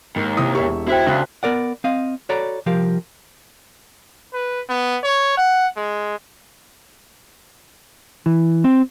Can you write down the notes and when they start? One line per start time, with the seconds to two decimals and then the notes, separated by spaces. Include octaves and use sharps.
0.16 D#2 G#2
0.37 C3 E4 D#6
0.55 E1 G4 E5 C#6
0.88 E4 F#4 C5 G5
1.07 D2 C#3 E5 F5 F#6
1.43 B3 A#4 D5 F#5
1.84 C4 D#5 F5
2.29 F#4 A4 C#5 D5 A#5 B5
2.66 C2 F3 G4 A#4 F5
4.34 B4
4.69 B3
5.03 C#5
5.37 F#5
5.77 G#3
8.26 E3
8.64 C4